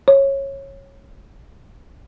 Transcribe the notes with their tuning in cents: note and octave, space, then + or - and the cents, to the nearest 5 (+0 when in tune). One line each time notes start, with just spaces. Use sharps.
C#5 -15